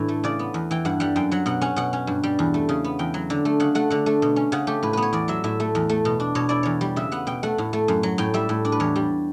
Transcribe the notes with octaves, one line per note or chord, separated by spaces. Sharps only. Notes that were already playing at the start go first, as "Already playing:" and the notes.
Already playing: A2 E3 D4
A3
C#3 D5
B3
E2
E3 G5
G2 F#5
G3 F#5
F#2 G5
F#3 F#5
B2 F#5
C#4 F#5
B2 F#5
C#4
G2
G3
E2
A3
C#3
B3
E2 G5
F#3
D3
A3
C#3 F#5
A3 F#5
D3 F#5
A3
B2
C#4
C#3 F#5
A3 G4
A2 B4
B3 B4
C#5
E2 D5
F#3 E5
A2 E5
A3
E2
A3
B2
D4
B2 C#5
E4 D5
E2 C#5
G3
C#3 E5
B3 F#5
B2 G5
A3 F#5
A2
A3
F#2
F#3
A2 G5
G3 E5
A2
D4
B4
E2 C#5
G3